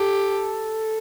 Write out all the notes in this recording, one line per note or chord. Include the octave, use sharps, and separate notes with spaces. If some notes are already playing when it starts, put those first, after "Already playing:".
Already playing: G4 A4